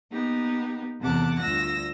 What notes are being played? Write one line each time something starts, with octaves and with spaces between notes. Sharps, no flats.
A#3 B3 D#4 G4
E2 C3 A4 F#5 A5 D6
D2 G2 F4 E6 A#6